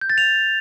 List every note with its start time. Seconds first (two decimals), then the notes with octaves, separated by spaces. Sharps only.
0.01 G6
0.10 A6
0.18 F7